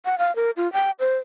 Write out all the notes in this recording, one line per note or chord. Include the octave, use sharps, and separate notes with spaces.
F#5
F5
A#4
F4
G5
C5